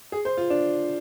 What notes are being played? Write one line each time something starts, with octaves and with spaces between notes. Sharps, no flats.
G#4
C5
F4
D4